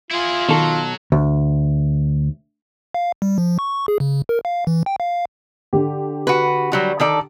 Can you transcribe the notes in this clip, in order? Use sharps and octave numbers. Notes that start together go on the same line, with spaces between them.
E4 F4 G#4
B2 D#3 F#3 A4
D2
F5
G3
F3
C#6
G#4
C#3
A#4
F5
E3
G5
F5
D3 G4
F#4 B4
F#3 G3 F#4
D#3 A4 D5